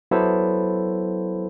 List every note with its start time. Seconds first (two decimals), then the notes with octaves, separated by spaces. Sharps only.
0.11 F#3 B3 E4 A4 C5